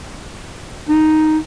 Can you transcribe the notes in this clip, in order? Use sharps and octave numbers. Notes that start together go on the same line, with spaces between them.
D#4